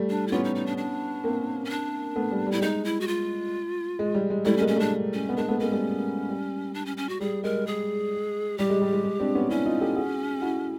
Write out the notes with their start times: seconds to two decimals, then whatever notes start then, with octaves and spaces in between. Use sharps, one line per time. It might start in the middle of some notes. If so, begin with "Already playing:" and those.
Already playing: G3 A3
0.10 D4
0.27 E4
0.32 B3 C#4 F4
0.44 D#4
0.55 D#4
0.66 D4
0.78 D4
1.24 A#3 C4
1.65 C#4
1.70 D4
2.16 A3 B3
2.31 G3
2.47 G3
2.52 E4
2.57 G3
2.62 G#3 D#4
2.85 E4
3.01 F#4
3.07 F4
3.99 G#3
4.14 G3
4.30 G#3
4.45 G3 A3 E4
4.57 C#4
4.61 G#3 A#3
4.68 C#4
4.76 G3 A3 D4
5.14 C#4
5.29 B3
5.37 G#3 A#3 D4
5.48 A3 B3
5.59 G#3 A#3 C#4
5.72 G3 A3
6.29 G3
6.74 D4
6.86 C#4
6.97 C#4
7.09 F#4
7.20 G3 G#4
7.44 G#3 A#4
7.67 G#4
8.58 G3 G4
8.70 G#3
8.82 G3
8.93 G#3
9.04 G#3
9.20 C4 D4
9.35 B3 C#4
9.50 C#4 D4 E4
9.66 D#4 F4
9.81 G4 A4
9.96 F#4 G#4
10.42 E4 F#4